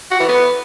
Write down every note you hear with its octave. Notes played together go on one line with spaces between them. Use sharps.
F#4
E3
B3